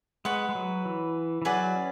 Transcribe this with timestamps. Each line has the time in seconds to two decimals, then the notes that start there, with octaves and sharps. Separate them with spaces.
0.25 G#3 B4 F#5 C#6
0.49 G#3
0.55 F#3
0.85 E3
1.42 E3
1.45 F#3 G#4 B4 D5 F#5
1.76 C#4